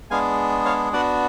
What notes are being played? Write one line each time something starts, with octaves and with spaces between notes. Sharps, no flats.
G#3 B3 D4 G#4 F5 G#5
C#5 F5
B3 D4 F#4 D5 F#5